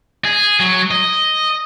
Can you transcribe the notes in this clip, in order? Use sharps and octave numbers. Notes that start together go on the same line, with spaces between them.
G#4
F#3
D#5